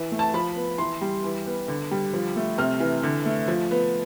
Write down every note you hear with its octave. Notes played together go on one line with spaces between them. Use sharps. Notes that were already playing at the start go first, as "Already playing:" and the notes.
Already playing: E3
A3
A5
F3 B5
B3
E3 C6
G3
E3
B3
D3
G3
F3
A3
C3 F6
E3
D3
A3
F3
B3